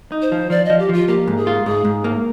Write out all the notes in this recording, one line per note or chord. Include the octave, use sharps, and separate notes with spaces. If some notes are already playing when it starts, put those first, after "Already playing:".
D#4
C5
F3
F3 D5
F3 D#5
G4
F3 F4
A#3 G4
G#2
G#4
F4
G#2 G#4
G#2
A#3